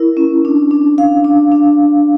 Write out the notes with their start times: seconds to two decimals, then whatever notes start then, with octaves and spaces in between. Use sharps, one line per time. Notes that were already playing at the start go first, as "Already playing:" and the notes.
Already playing: E4 A#4
0.17 C#4
0.45 D4
0.71 D4
0.98 F5
1.24 D4
1.52 D4